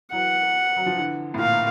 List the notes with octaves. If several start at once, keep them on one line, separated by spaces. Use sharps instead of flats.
E3 F#3 F#5
F#3
F3
D3 E3
A2
A#2 F5